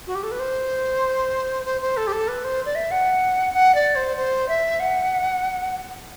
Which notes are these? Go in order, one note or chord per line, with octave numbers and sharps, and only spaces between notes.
F#4
G4
A4
B4
C5
C5
C5
A4
G4
A4
B4
C5
D5
E5
F#5
F#5
D5
C5
C5
E5
F#5